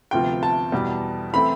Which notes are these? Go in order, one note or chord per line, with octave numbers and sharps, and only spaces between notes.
D2 C3 F3 B3 F4 G5
A5
E2 B2 G3
E3 A3 C4 E4 B5